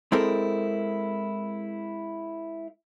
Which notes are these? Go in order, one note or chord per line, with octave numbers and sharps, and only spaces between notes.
G#3 C4 E4 A4 A#4